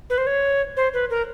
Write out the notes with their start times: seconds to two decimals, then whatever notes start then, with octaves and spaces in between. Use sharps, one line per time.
0.10 B4
0.18 C5
0.27 C#5
0.77 C5
0.94 B4
1.10 A#4